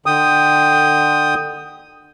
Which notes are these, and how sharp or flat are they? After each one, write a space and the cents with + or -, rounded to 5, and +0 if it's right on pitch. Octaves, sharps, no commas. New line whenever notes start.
D3 +30 G5 +5 D#6 +0